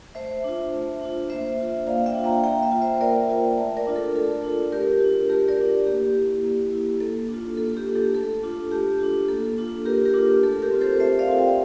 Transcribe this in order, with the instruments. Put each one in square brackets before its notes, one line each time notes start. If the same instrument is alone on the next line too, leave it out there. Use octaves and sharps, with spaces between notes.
[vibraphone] A3 C5 E5
D4 F4
A3
D4 F4
A#3 C5 E5
D4 F4
A#3 D5 F5
E5 G5
D4 F4
G5 A#5
A#3 G5 A#5
E5 G5
F4
C5 E5
A#3 A#4 D5
F4
A3
A#4 D5
D4 F4
A4
A3 A4
D4 F4
A3 G4 A#4
D4 F4
A3 G4 A#4
A#4 D5
D4 F4
A#3 G4
E4
A#3
E4
A#3 A4
D4
F4
A#3 A4
G4
D4 F4
A4
A3 A4
D4 F4
A3 G4
D4 F4
A#3 A4
D4 F4
A#3 G4 A#4
G4 A#4
D4 F4
A3 A4
G4 A#4
C4 F4
A4 C5
A3 C5 E5
D5 F5
C4 F4
E5 G5